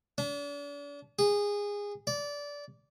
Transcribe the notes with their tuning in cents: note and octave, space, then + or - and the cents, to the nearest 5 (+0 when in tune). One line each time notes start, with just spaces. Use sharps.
D4 -40
G#4 -20
D5 -20